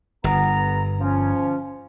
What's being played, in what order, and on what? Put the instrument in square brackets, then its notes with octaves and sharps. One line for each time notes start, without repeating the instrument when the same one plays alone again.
[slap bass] G1 [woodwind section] B3 A#5
[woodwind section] F3 C#4